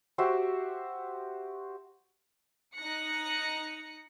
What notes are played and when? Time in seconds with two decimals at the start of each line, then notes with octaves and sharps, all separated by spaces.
0.18 F#4 G4 C5 E5
2.75 D#4 F#6 A#6 C#7